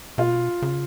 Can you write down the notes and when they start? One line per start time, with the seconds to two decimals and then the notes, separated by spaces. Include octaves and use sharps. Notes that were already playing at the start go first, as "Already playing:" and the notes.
0.18 B2 F4
0.62 C#3